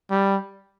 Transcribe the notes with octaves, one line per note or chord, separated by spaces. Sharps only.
G3